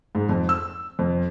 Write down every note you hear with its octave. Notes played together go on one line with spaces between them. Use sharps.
G#2
F2
E6
F2